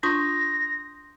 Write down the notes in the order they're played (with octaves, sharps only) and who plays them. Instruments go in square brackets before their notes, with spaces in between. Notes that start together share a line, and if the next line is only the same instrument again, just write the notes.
[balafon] D4 F4 C#6 [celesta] C6 D#6 G6 [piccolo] A#6